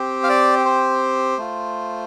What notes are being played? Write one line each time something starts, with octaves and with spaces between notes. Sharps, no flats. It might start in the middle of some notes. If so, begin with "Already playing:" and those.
Already playing: C4 G4
F5
D5
C5
A3 F4